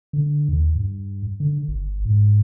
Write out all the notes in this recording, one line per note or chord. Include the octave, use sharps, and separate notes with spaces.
D3
D#2
G2
D3
G1
G#2